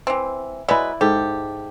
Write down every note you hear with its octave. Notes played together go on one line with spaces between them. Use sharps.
E3 C4
F#3 G#3 E4 B4 D5
G#2 G4 A4